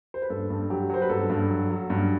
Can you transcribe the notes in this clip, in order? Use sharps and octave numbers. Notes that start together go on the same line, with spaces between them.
C5
B4
G2 A4
G2
F#3 G4
F#3 C5
B4
G2 A4
G2
F#3
F#3
G2